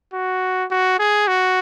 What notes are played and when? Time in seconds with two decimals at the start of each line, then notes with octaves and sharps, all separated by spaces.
0.13 F#4
0.71 F#4
0.99 G#4
1.28 F#4